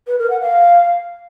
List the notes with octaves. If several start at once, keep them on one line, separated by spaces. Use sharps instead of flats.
B4
A#4
F#5
F5